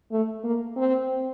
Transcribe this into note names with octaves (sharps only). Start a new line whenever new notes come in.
A3
A#3
C4